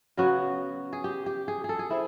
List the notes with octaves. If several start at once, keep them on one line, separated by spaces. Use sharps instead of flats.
C#3 F#3 B3 F#4
G#4
G4
G4
G#4
G#4
A4
G#4
C4 E4